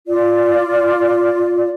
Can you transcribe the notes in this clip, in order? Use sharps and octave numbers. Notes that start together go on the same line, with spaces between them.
F4 D5